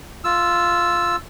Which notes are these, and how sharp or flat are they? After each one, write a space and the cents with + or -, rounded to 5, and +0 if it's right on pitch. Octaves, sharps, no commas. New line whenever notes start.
F4 +0 E6 +5